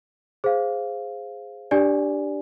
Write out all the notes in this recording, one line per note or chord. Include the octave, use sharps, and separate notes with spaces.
G#4 C5 F5
D4 G4 D5 G#5